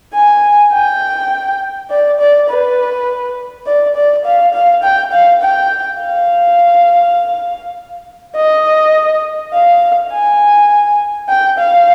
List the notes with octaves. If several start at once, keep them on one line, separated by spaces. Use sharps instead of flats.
G#5
G5
D5
D5
B4
D5
D5
F5
F5
G5
F5
G5
F5
D#5
F5
G#5
G5
F5